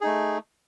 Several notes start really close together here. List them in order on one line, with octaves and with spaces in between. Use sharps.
G#4 D#4 A3